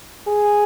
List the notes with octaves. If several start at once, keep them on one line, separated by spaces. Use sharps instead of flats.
G#4